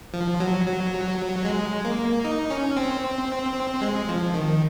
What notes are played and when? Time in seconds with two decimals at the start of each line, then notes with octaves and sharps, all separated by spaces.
0.14 F3
0.40 F#3
0.66 F#3
1.45 G#3
1.85 A#3
2.24 D#4
2.50 C#4
2.76 C4
3.82 G#3
4.09 F3
4.34 D#3